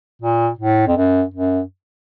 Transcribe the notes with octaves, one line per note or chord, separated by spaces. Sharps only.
A#2
A2
F2
F#2
F#2